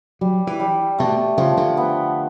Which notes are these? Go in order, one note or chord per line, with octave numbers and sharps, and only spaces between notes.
F#3 G3
E3
G3
B2 A3
C#3 F3
D3
B3